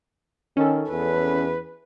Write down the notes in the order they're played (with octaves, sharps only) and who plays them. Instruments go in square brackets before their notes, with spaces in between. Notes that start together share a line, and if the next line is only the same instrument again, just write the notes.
[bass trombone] D#3 [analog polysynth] C#4 A4
[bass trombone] E2 [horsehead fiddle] B4